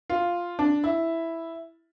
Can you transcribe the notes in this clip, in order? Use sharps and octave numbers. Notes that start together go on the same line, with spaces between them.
F4
D4
E4